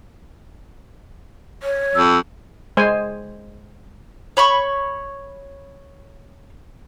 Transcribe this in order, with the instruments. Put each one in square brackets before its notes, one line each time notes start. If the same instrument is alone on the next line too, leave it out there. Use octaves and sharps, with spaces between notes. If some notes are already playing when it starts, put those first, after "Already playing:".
[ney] C#5
[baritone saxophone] F2 [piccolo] E6
[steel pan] G#3 C5 G#5
[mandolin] C#5 B5 C#6